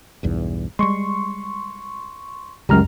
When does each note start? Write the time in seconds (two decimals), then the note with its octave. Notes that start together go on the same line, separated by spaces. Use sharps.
0.23 B1 E2 G2
0.79 G3 G#3 C6 C#6
2.69 C#2 F#2 G3 G#3 G4 A#5 F6